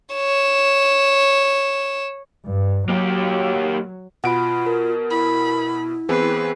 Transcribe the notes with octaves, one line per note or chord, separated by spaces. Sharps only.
C#5 E7
G2
F#3 A#3 G4
B2 F4 F#5 B5 D7
A#4
E4 B5
E3 B3 C4 G#4 B4 C7